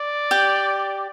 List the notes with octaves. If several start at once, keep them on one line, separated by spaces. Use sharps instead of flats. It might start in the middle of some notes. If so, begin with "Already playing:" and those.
Already playing: D5
G4